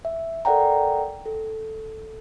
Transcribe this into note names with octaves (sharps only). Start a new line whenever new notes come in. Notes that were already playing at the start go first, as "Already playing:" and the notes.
E5
A4 A#4 D5 F#5 G5 A#5
A4